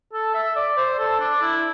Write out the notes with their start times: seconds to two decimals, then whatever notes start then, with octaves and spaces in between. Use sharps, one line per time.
0.13 A4
0.34 E5
0.56 D5
0.77 C5
0.99 A4
1.20 D4
1.42 E4